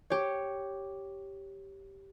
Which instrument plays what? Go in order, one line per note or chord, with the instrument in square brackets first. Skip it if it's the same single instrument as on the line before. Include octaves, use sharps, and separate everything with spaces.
[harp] G4 C#5